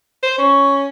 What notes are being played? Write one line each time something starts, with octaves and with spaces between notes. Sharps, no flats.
C5
C#4 C#6